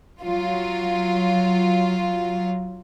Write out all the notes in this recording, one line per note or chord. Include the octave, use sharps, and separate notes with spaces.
F#3 F4